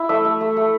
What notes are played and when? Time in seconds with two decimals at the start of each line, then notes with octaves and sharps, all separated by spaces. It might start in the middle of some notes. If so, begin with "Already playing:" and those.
Already playing: E4
0.09 A3 E5
0.25 A3
0.41 A3
0.57 A3